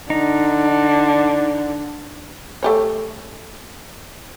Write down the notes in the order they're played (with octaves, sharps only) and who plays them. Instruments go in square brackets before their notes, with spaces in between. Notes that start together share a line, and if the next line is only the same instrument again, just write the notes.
[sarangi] D3 [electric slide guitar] D#4
[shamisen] A3 G4 C#5